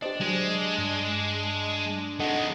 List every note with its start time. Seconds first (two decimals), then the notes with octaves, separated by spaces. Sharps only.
0.02 D4 G4 C5 D#5
0.21 F#3 G#3 G#4
0.78 G2
2.19 D#3 G#3 A4 D#5 F#5